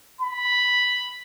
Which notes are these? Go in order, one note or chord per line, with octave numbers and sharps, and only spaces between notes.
B5